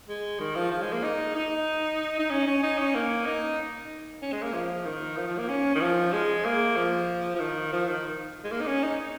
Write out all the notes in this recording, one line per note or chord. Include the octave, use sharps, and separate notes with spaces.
G#3
D#3
F3
F3
G#3
A#3
D#4
D#4
D#4
C#4
C#4
D#4
C#4
A#3
D#4
C#4
G#3
A#3
F3
D#3
F3
F3
A#3
C#4
D#3
F3
G#3
A#3
F3
F3
D#3
F3
D#3
G#3
A#3
D#4
C#4
D#4